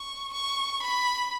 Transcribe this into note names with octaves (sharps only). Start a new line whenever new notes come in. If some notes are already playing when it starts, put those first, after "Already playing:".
Already playing: C#6
C#6
B5